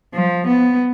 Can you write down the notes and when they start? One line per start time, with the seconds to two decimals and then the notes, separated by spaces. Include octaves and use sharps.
0.13 F3
0.47 B3